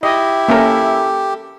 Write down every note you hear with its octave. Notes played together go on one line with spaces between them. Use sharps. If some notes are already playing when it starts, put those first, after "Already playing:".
E4 G4 D#5
A#3 C#4 A4 A#4 E5